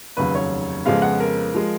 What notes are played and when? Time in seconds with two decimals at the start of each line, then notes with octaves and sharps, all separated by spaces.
0.17 F1 D#2 C#3 F#3 B4
0.35 C#5
0.85 F2 C#3 F3 G#3 B3 F5
1.02 F#5
1.20 A#4
1.55 F3 G#3